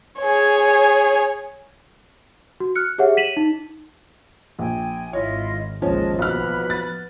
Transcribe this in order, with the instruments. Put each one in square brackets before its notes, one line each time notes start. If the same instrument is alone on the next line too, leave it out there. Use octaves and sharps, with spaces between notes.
[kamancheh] G#4 C#5
[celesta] F#4
F6 F#6 C#7
G4 G#4 C#5 E5 F#5
B6 D#7 E7 F#7
D#4
[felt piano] A#1 [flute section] G5 G#5
[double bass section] G#1 [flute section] E4 F4 D#5 [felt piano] C#5
[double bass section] A1 D#2 G#3 [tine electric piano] F3 [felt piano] C#4 [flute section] D#5 A5
[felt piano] B1 F6 [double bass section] B3 [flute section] B5 F#6
[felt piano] A6